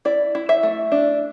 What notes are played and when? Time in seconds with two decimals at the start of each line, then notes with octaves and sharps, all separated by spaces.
0.05 E4 D5
0.35 E4
0.49 E5
0.63 A3
0.92 D4